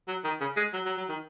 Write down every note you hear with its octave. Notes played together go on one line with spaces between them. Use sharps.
F#3
D#3
C#3
G#3
F#3
F#3
F#3
D#3